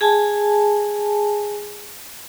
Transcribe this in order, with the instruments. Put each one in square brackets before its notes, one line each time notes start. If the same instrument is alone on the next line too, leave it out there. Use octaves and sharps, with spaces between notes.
[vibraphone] G#4 G#5 A5